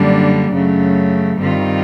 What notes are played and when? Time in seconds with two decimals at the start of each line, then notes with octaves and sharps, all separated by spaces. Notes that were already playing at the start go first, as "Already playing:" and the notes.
Already playing: F#2 D3 G3 A#3 D4
0.53 F#2 C#3 F#3 A3
1.40 G2 D#3 G3 C4 F4